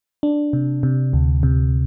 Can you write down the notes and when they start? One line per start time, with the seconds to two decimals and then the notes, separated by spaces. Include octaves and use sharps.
0.23 D4
0.53 C3
0.83 C3
1.13 D2
1.43 C3